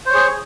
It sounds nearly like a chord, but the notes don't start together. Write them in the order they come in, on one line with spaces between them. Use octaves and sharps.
C5 C#5 G#4